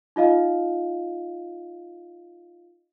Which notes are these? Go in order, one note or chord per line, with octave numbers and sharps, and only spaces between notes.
D#4 F4 D#5 F5